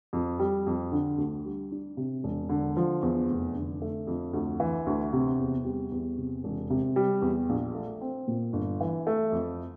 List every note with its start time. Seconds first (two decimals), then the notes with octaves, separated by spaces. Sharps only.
0.13 F2
0.39 G3
0.67 F2
0.92 D3
1.18 D2
1.45 G3
1.72 D4
1.97 C3
2.24 E1
2.49 D3
2.77 F3
3.02 E2
3.29 F1
3.55 D3
3.82 A3
4.07 F2
4.33 D2
4.60 E3
4.86 D2
5.13 C3
5.39 E2
5.65 G3
5.92 E2
6.18 C3
6.44 E1
6.70 C3
6.96 G3
7.22 E2
7.49 A#1
7.74 A3
8.01 C4
8.28 A#2
8.53 G1
8.80 E3
9.07 A3
9.32 F2